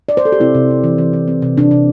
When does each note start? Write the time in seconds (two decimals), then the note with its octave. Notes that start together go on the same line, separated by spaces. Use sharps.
0.09 D5
0.17 C5
0.25 A4
0.32 G4
0.40 C3 C4 E4
0.55 C3
0.70 C3
0.84 E3
0.98 E3
1.13 E3
1.28 C4
1.42 C3
1.57 C3 D4
1.71 C3